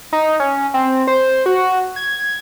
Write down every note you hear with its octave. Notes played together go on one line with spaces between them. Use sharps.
D#4
C#4
C4
C5
F#4
G#6